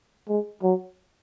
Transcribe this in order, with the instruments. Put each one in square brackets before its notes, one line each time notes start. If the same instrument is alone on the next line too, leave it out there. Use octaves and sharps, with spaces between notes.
[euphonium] G#3
F#3